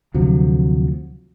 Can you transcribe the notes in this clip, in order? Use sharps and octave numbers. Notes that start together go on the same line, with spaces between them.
D2 C3 F3 F#3